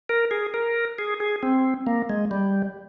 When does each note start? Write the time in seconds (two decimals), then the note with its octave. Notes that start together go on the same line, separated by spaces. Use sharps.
0.09 A#4
0.31 G#4
0.54 A#4
0.98 G#4
1.20 G#4
1.43 C4
1.87 A#3
2.09 G#3
2.31 G3